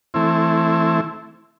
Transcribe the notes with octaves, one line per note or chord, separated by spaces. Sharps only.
E3 A3 C4 E4